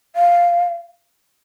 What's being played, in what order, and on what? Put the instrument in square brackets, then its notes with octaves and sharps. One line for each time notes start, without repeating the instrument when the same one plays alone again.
[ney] F5